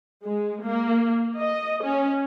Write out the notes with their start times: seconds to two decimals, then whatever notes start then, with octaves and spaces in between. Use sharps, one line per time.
0.25 G#3
0.63 A#3
1.39 D#5
1.82 C#4